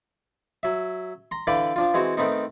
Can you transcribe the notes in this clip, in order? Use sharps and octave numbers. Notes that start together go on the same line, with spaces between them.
F#3 E5
A#5 C6
D3 E3 B4 D5 F5 G5
F3 D4 F4
E3 G#3 C4 F#4
D#3 A3 B3 C4 D#4